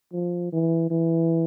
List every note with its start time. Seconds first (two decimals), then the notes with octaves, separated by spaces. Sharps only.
0.13 F3
0.52 E3
0.90 E3